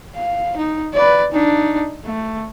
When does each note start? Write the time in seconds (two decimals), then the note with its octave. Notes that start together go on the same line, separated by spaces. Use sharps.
0.15 F5
0.57 D#4
0.94 B4 D5
1.32 D4 D#4
2.05 A3